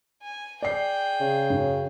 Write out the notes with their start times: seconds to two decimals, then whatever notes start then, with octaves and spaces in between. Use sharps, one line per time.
0.22 G#5
0.62 G#4 D5 G5 C7
1.20 C#3
1.50 F#2